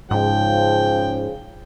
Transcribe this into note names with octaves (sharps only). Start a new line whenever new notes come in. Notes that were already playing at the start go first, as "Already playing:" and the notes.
G#2 C#3 F3 G5